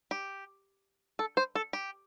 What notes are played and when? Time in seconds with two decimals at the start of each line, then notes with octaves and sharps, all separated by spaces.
0.11 G4
1.19 A4
1.37 C5
1.55 A4
1.73 G4